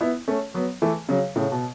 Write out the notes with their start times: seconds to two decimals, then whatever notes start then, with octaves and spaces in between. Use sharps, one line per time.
0.01 B3 E4
0.28 A3 C#4
0.54 F#3 B3
0.82 E3 A3
1.09 C#3 F#3
1.36 A2 C#3
1.52 B2